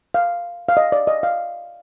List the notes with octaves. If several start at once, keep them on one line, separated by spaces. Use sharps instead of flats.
F5
F5
D#5
D5
D#5
F5